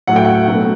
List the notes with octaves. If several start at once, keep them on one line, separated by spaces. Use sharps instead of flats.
A2 F#3 A3 F#5
G5
F#5
B2 F#3 A3